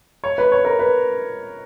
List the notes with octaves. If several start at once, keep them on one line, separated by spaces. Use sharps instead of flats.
C#5
B4
C#5
A#4
B4